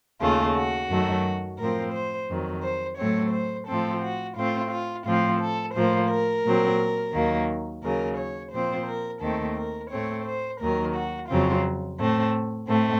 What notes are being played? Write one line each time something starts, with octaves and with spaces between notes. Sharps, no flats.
D#2 C#3 A3 F4
F#4
F#2 D#3 F#3 A3
A2 F3 C4 A#4
C5
F2 D#3 F#3
C5
A2 F#3 A3 C4 C#5
C5
A2 F3 C4 A4
F#4
A2 A3 C4 F4
F4
A2 F3 C4 F4
A4
A2 F3 A#3 C5
A#4
A#2 F#3 C4
D#2 D#3 F#3 A#3
D#2 C#3 F#3 A#4
C#5
A#2 F3 C4 C5
A#4
D#2 D#3 A3 C4 A4
A#4
A2 A3 C4 C#5
C5
D#2 D#3 F#3 A#4
F#4
F2 C#3 F#3 C4 F4
A2 A3 C4
A2 A3 C4